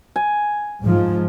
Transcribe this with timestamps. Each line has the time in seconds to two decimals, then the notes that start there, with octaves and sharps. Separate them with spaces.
0.16 G#5
0.82 G#2 F3